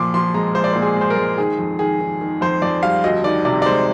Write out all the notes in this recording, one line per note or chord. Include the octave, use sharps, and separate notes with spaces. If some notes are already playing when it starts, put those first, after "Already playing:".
Already playing: A#2 F3 C6 D6
F3 C6
G#3 A#5
G#3 C5
D5
A#2 C5
G#4
G#3 C5
A#4
G#3
D#3 G#4
F2
D#3 G#4
D#3
D#3
F2 C5
F2 D5
G3 F5
D2 D#5
D#3 D5
C3 D5
D5
G#3 C5